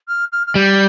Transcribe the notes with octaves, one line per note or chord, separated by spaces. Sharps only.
F6
F6
F6
G3 G6